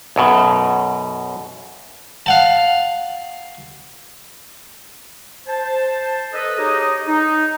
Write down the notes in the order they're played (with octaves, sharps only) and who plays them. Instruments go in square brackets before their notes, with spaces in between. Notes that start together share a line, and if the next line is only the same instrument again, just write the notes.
[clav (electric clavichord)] B1 F#2 B2
[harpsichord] F5 F#5 A5
[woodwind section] C5 A5
A4 B4 D#5
D#4 G4 G#4 C#5 D#5
D#4